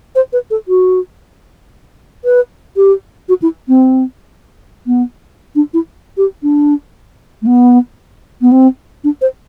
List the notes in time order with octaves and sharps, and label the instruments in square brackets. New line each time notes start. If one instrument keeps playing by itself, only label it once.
[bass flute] C5
B4
A4
F#4
B4
G4
F#4
E4
C4
B3
D4
E4
G4
D4
A3
B3
B3
C4
D4
C5